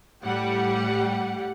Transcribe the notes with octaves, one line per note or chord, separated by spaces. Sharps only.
A2 G3 G4 F#5